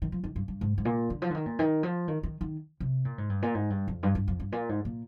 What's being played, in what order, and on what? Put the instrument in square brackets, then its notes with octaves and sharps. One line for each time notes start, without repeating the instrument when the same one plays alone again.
[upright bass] D#3
F3
D#3
G2
G2
G#2
G#2
A#2
D3
F3
D3
D#3
A#2
D#3
F3
D#3
D#3
D#3
C3
A#2
G#2
G2
A#2
G#2
G2
F2
G2
G2
F2
G2
A#2
G#2
A#2